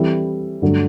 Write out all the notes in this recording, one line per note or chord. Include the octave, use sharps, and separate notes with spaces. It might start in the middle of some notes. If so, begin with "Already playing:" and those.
Already playing: E3 G3 C4 E4 A4
G2 D3 F#3 A3